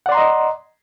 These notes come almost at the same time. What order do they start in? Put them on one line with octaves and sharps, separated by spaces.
F#5 D5 C6 A#5 D#5